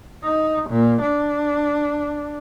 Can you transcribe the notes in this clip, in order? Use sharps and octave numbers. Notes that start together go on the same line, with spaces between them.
D#4
A#2
D4